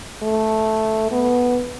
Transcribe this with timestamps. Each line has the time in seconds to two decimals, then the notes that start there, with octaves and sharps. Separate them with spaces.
0.22 A3
1.11 B3